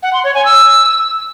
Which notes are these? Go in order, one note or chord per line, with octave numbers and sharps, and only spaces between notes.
F#5
C6
C#5
G#5
E6